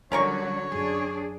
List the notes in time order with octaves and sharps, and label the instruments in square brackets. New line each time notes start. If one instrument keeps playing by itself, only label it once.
[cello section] D3 F#3 F#4 [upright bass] G3 [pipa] C#4 A#4 C#6 [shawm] C#5
[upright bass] F#2 [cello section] D4 G#4